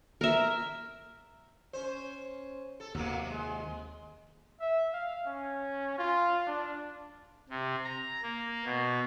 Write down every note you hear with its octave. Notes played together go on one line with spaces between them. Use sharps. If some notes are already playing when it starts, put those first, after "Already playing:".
A#4 E5
C#4 C5
A4
D#2 C3 F#3 A#3
G#3
E5
F5
C#4
F4
D4
C3
A#5
A#3
B2